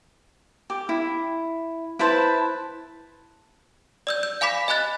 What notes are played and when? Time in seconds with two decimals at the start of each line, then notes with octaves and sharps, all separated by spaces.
0.70 G4
0.89 E4
1.99 E4 B4 C5 A5
4.07 D5 E6 G6
4.23 G6
4.41 F5 G#5 B5 D6 B6 E7
4.68 D#5 G#5 B5 F#6 A6